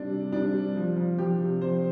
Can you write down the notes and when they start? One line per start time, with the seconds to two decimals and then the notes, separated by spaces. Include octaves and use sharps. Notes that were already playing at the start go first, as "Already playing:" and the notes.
Already playing: C3 G3 C4 D4
0.11 G3
0.32 G3 D4
0.54 G3
0.76 F3
0.96 F3
1.18 F3 G4
1.40 C3
1.61 F3 C5